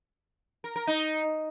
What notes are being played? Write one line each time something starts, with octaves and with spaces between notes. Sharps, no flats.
A#4
A#4
D#4